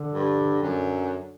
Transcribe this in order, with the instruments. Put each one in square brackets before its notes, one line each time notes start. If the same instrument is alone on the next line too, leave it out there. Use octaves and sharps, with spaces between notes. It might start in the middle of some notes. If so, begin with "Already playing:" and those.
Already playing: [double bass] D3
[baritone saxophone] G2
F#2